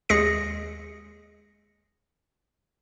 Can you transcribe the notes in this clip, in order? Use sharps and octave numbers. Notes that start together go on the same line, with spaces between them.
D#2 G#3 G#4 A#6 C#7